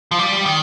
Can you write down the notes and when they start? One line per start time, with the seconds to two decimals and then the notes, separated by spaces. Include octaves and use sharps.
0.11 F3
0.19 G3
0.46 D#3